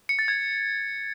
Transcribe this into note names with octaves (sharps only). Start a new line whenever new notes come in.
C#7
A6
G#6